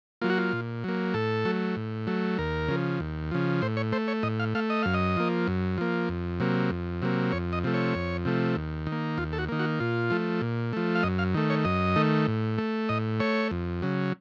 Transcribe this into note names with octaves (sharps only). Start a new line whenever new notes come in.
F#3 A#3 F4
F#4
F4
A#2
F#3 A#3
A2 A4
F#3 A3
A2
F#3 A3
D#2 A#4
C#3 F3
D#2
C#3 F3
A2 C5
C#5
A3 C5
C#5
A2 D#5
F5
A3 F5
D#5
F#2 F5
D#5
F3 A#3
F#2
F3 A#3
F2
C3 F#3 A#3
F2
C3 F#3 A#3
F2 C#5
D#5
C3 F3 A3
C#5
F2
C3 F3 A3
D#2
D#3
A#3
D#2 F4
A4
F#4
D#3 A#3
F#4
A#2 F4
F3 A3
A#2
F3 A3
F5
F#2 D#5
F5
D#3 A3
C#5
F#2 D#5
D#3 A3
A2
A3
A2 D#5
A3 C#5
F2
C#3 F#3